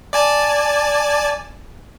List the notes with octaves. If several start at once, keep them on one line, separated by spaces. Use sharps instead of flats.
D5 G#5 A5